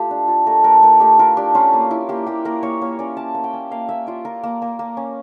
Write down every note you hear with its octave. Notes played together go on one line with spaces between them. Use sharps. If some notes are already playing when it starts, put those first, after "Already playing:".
Already playing: A3 F4 G4
D4
F4
A3 A#4
A3 A#4
A3 A#4
A3 G4
F4 A#4
D4 G4
C#4 F4
A#3
E4
A#3 G4
A#3 G4
A#3 A#4
A#3 C#5
A#3 C#5
C#4 D5
C#4 A5
A#3
G5
C#4
A#3 F5
A#3 E5
F4 D5
F4 A#4
A#3
A#3
A#3
C#4